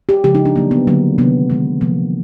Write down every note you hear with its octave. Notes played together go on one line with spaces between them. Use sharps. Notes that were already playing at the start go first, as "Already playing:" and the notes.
G4
C#3 F3 G#3 G4
D#4
D4
D3 F#3 A#3
B3
D3 F#3 A#3
C3 D#3 G#3 B3
C3 D#3 G#3
C3 F3 A#3